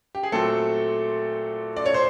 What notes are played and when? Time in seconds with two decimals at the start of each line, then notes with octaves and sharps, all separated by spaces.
0.15 G4
0.23 G#4
0.32 A#2 F#3 A3 C4 A4
1.76 D5
1.86 C#5
1.94 C5